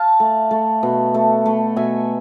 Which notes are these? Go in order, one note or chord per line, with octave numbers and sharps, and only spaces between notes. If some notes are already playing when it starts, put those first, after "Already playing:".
Already playing: F5 A5
A3
A3
B2
A3
A3
B2 E5 G#5